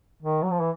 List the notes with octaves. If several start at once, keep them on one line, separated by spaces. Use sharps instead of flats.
D#3
F#3
F3
E3